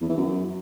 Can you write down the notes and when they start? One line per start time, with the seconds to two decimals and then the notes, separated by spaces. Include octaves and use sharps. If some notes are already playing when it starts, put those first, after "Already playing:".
0.01 E2
0.09 E3
0.17 F#2